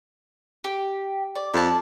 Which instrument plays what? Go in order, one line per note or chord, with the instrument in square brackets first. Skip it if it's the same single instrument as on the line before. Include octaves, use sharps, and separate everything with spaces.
[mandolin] G4
D5
[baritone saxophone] F2 [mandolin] D5 A5